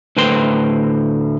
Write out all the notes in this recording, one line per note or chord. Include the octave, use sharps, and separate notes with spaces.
D2 A2 B4 C5 G5 C6